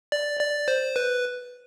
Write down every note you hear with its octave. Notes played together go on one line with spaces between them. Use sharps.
D5
D5
C5
B4